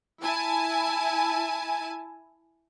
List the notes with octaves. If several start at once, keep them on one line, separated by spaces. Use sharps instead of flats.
E4 G#5 A5